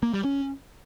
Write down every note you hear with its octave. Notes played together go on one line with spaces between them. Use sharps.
A#3
G3
C#4